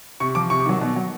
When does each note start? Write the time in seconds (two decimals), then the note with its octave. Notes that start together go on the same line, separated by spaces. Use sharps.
0.20 C3 C#6
0.35 F3 D6
0.50 C3 C#6
0.66 D#3 F#3
0.81 B2
0.96 F#3